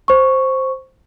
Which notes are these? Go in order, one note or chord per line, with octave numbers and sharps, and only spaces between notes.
C5 C#6